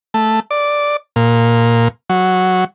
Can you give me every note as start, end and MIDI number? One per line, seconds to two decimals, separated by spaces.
0.14 0.40 57
0.51 0.97 74
1.16 1.88 46
2.10 2.64 54